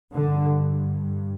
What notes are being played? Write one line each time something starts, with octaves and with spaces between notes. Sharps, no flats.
G2 D3